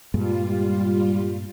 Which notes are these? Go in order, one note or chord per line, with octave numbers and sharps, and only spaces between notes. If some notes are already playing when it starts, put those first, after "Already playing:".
G2 A#2 G3 G#3 F4